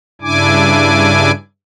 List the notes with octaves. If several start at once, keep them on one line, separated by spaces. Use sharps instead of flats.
G2 C#3 D4 E4 G#5 D6